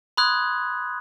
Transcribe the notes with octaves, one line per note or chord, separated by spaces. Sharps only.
B5 C6 D#6 F#6 G#6